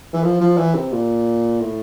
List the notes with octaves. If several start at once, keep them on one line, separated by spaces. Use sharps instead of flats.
E3
F3
F3
E3
C3
A#2
A2